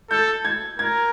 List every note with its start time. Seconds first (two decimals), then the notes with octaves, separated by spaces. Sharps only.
0.11 A4 G6
0.45 G#6
0.79 A#4 G#6